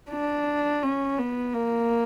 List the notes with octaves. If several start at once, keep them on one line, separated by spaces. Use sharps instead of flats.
D4
C#4
B3
A#3